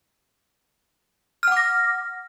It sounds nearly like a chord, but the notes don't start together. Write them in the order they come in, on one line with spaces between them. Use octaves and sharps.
F6 F#5 D6 A#6